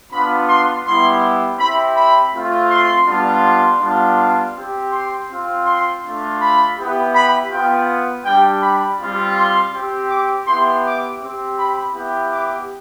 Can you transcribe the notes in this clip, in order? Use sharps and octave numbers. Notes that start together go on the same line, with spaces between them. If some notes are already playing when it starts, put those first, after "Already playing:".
B3 D4 F4 B5
C6
G3 B3 E4 G4 C6
C4 E4 G4 B5
B5
A3 C4 F4
C6
G3 B3 D4 F4
C6
G3 B3 D4 F4
C6
C4 G4
C6
C4 F4
C6
A3 D4 F4
B5
B3 E4 G4
B5
B3 F4 G5
G3 D4 G4 G5
B5
G3 C4 F4
C6
C4 G4
D6
B3 E4 G4 C6
D6
C4 G4
B5
B3 E4 G4
D6